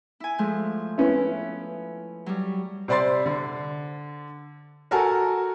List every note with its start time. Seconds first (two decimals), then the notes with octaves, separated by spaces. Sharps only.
0.20 E4 G#5
0.39 F3 G#3 A3
0.98 B3 C#4 E4
2.26 F#3 G3
2.88 C3 C5 D5 B5 C6 A6
3.26 D3
4.91 F#4 A4 A#4 F#5 G#5 A5